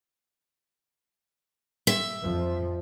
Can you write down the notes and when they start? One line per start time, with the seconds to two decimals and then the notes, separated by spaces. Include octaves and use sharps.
1.87 E5
2.22 F2 F3